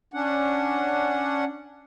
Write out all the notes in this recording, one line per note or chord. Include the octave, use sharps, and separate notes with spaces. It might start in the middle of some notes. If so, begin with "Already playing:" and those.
C#4 D4 F#5